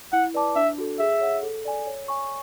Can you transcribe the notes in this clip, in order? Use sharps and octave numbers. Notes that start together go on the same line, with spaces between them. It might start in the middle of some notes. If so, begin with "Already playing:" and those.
E4 F#5
B4 D5 A5 D6
D4 E5
F#4 A4
G#4 E5
C#5 F#5
A4
D5 G#5
C#5
G#5 C#6